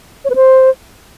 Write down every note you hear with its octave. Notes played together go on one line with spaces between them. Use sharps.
C#5
B4
C5